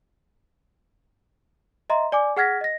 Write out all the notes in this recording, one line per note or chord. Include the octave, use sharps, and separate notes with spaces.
D#5 E5 A#5 C6
D5 G#5 D6
G#4 F#5 F6 G#6 A#6 B6
D#5 A#6